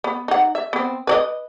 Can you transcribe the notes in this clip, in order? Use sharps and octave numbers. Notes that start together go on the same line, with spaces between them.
B3
D#4 F#5
E5
B3 C4
B4 D5 D#5